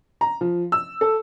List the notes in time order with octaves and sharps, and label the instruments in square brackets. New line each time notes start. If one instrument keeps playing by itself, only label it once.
[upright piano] A#5
F3
E6
A4